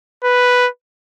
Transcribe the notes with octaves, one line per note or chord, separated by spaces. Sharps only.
B4